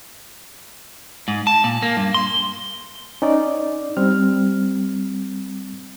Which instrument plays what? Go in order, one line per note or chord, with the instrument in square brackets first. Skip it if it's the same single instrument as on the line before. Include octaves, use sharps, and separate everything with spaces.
[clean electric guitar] G#2
A5
A#2
A#3
G2
C6
[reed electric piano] C#4 D#4 D5
G3 C4 F6